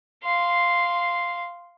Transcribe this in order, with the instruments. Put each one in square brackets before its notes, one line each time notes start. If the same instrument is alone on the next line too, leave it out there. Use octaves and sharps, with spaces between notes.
[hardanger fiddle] F5 C6